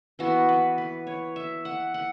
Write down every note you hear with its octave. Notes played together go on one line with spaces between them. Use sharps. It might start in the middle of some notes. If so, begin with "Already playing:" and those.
E3 B3 F#4
B4
B4
C#5
E5
F#5
F#5